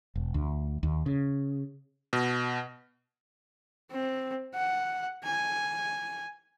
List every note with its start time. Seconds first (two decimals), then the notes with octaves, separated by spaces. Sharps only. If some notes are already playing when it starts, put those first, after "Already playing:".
0.15 E1
0.34 D2
0.83 D#2
1.06 C#3
2.13 B2
3.91 C4
4.54 F#5
5.25 G#5